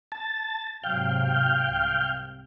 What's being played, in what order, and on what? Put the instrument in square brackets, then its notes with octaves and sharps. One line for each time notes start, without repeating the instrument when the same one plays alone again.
[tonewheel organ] A5
[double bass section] G#2 C3 F#3 [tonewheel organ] F5 G5
[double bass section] C2